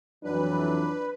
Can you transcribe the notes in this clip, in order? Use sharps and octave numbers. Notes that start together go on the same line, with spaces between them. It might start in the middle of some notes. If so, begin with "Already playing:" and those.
F2 E3 F#3 D4 B4